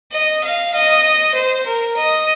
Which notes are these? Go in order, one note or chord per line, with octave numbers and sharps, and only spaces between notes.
D#5
F5
D#5
C5
A#4
D#5